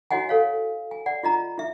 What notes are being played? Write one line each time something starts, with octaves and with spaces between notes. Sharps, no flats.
E4 F#4 C#5 D#5 F#5 G#5
A4 C#5 F5
G#5
D5 F#5
F4 D#5 A#5
E4 E5